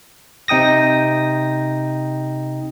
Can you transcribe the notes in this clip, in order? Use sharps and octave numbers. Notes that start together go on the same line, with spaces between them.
C3 D#4 G5 D#6 A#6